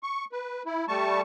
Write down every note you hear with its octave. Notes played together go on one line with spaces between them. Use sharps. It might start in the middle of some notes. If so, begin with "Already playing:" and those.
C#6
B4
E4
G3 A3 A5 C#6